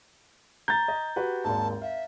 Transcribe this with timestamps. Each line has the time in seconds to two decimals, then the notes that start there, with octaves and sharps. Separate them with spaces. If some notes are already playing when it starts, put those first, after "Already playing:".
0.68 A#5 G6 A6
0.88 D#5
1.16 F#4 G4 B4
1.44 G#1 D#2 G#2 A5
1.82 E5 F5